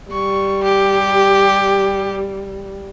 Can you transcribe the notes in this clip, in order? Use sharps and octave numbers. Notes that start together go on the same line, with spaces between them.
G3 C#6
G4